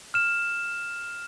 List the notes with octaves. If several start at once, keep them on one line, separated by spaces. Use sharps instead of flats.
F6 E7